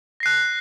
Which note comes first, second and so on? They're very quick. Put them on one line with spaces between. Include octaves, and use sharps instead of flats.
A#6 C7 F#6